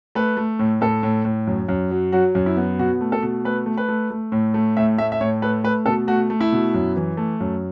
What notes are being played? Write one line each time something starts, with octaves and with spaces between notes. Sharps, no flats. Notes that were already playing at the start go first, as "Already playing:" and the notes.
A3 B4
A3
A2
A2 A4
A2
A2
F#2
F#2
F#3
F#3 F#4
F#2
E4
B3
B2 F#4
A3
A4
B2
A3 B4
A3
B4
A3
A3
A2
A3
A2 E5
A3 E5
E5
A2 C#5
A3 B4
A3 B4
B2 A4
A3 F#4
A3
E4
B2
F#2
E3
A3
F#2